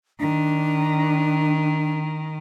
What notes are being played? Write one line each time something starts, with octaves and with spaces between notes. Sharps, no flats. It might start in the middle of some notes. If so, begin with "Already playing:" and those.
D#3 D4